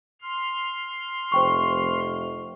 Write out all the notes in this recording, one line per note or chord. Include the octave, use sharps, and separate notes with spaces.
C6 F6
F1 C5 G5 C#6